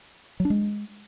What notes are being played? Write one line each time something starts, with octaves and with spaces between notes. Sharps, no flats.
F#3
D4
G#3